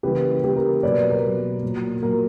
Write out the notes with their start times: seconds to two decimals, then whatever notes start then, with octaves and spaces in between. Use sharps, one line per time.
0.03 C#3 E3 G3 A#3 G4 B4
0.43 C#3 E3 G3 A#3 G4
0.56 A#4
0.83 B2 F#3 A#3 B4 D5
1.10 A#4
1.23 B2 F#3 A#3
1.63 A#2 F#3 A#3
2.03 A#2 F#3 A#3 A#4